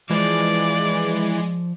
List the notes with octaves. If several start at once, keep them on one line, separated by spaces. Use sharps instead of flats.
E3 F3 G#3 D5